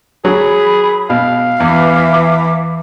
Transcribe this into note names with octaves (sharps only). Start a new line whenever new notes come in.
F#3 G#4 B5
B2 F5
E2 E3 B4 E5 D6